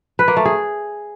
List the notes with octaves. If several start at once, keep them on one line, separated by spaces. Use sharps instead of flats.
B4
A#3
A3
G#4